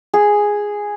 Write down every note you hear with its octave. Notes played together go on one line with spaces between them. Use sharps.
G#4